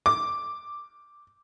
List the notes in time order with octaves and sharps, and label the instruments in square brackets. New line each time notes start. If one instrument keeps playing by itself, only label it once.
[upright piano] D6